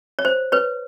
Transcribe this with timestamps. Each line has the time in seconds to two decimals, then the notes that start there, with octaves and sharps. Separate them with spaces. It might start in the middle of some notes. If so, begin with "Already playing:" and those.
0.19 C#5
0.25 C5
0.52 B4 C#5